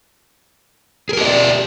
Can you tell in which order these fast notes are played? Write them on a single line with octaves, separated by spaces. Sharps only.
G#4 A#4 G4 D#5 D5